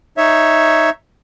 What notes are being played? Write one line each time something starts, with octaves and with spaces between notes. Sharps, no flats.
D#4 C#5 E5